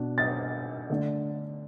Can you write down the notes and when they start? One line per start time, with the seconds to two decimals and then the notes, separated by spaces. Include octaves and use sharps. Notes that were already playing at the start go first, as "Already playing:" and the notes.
Already playing: B2 D4
0.18 A6
0.90 D3 A3 D4